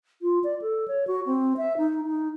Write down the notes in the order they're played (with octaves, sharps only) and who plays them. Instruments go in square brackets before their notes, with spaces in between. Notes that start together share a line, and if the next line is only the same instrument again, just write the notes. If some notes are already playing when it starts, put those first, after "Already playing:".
[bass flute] F4
D5
A4
C#5
F#4
C4
E5
D#4
D#4